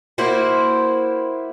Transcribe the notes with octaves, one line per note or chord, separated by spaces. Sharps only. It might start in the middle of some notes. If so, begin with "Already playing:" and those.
A#3 E4 F#4 C5